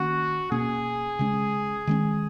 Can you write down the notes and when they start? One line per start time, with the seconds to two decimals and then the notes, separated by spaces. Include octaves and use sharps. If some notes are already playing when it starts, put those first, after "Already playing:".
Already playing: D#3 A#3 C#4 F#4
0.51 B2 A#3 C#4 G#4
1.19 C#3 G#3 C#4
1.87 D#3 G#3 C#4